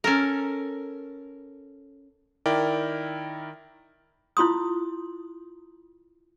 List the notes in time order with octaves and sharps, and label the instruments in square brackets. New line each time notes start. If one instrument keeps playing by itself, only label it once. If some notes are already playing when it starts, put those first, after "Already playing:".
[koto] C#4 A4 A#4
[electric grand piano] D#3 E4 A#4 D5 G5
[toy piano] E4 F4 C6 D#6